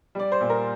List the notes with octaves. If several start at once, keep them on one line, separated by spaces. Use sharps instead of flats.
G3 D5
C5
A#2
A#4